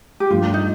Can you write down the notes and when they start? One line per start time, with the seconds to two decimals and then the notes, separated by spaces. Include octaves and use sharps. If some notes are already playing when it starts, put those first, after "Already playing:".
0.20 G4
0.30 G2 F3 A3 F4
0.54 D#4